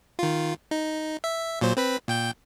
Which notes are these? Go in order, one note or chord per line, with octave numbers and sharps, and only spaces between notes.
D#3 F4
D#4
E5
A#2 F#3 C5
C4 B4 B6
A#2 G5 G6